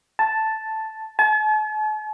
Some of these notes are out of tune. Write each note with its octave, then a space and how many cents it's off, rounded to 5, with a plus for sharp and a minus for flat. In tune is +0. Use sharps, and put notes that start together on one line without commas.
A5 +0
A5 -45